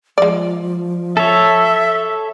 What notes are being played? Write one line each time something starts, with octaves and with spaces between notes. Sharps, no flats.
F3 G#3 D5
A4 C#5 E5